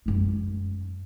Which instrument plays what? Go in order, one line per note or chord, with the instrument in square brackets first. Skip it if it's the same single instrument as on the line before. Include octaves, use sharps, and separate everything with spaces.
[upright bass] F#2 G#3